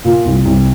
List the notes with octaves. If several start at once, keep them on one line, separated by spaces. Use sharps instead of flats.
A#2
C2
C2